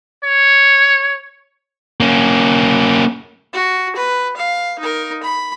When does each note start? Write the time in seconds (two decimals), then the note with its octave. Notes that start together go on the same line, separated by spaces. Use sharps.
0.24 C#5
2.00 A#3 C#4
3.53 F#4
3.96 B4
4.37 F5
4.79 D#4 A#4
5.23 B5